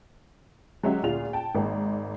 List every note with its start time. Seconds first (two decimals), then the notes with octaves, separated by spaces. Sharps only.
0.83 F#3 G#3 C#4 F#4 G4 E5
1.03 D2 A#2 F4 G#4 F7
1.33 G5 A5
1.55 G#1 G#2 A#3